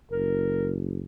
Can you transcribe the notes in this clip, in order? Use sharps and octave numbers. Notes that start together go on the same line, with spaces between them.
F#1 A#4